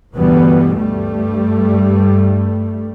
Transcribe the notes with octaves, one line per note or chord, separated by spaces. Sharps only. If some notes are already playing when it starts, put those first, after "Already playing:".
D2 G2 B2 E3 G3 B3
G2 G3 A3